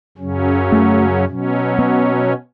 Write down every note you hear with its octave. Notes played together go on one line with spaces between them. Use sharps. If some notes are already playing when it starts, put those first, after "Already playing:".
F#2 C#3 F#3 C#4
A3
B2 F#3 C#4
B3